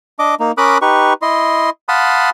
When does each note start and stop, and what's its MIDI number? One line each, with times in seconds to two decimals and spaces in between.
0.19 0.35 62
0.19 0.35 75
0.19 0.35 86
0.40 0.52 58
0.40 0.52 63
0.58 0.78 61
0.58 0.78 70
0.58 0.78 83
0.58 0.78 86
0.58 0.78 87
0.58 0.78 90
0.82 1.13 63
0.82 1.13 67
0.82 1.13 71
0.82 1.13 85
1.22 1.70 64
1.22 1.70 75
1.22 1.70 84
1.89 2.30 77
1.89 2.30 78
1.89 2.30 81
1.89 2.30 83
1.89 2.30 84
1.89 2.30 87